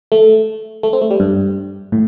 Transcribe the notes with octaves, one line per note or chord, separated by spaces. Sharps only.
A3
A3
C4
A3
G3
G2
A2